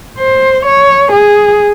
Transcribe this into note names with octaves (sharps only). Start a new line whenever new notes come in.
C5
C#5
G#4